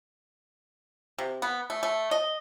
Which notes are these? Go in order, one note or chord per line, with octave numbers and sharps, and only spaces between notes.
C3
B3
A3
A3
D#5